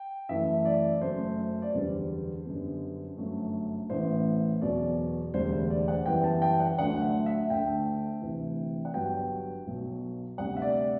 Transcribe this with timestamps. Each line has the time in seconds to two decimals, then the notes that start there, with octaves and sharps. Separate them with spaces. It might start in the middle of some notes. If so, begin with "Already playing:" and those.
Already playing: G5
0.29 F#2 E3 A3 E5
0.65 D5
1.01 F#1 F#2 F#3 A3 C5
1.62 D5
1.73 F#1 E2 D3 G3 B3 C5
2.46 F#2 D3 G3 B3
3.17 G1 F#2 F#3 A3
3.90 A1 A2 E3 B3 C5
4.62 E2 B2 F#3 B3 D5
5.34 E1 D2 D3 G3 C5
5.52 C5
5.70 D5
5.88 F#5
6.06 F#2 E3 G3 B3 G5
6.24 A5
6.42 G5
6.60 F#5
6.78 D2 D3 F#3 A3 F#5
7.02 E5
7.26 E5
7.50 D2 D3 A3 G5
8.22 D2 C3 E3
8.85 F#5
8.94 G1 G2 F#3 B3 G5
9.67 B1 B2 F#3
10.38 D2 C3 G3 F#5
10.56 E5
10.62 D5